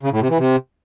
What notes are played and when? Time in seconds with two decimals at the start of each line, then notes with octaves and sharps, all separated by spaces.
0.03 C#3
0.12 A2
0.21 C3
0.29 E3
0.38 C3